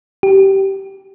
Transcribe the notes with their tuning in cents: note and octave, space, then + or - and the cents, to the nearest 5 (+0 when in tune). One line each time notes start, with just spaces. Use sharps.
G4 -20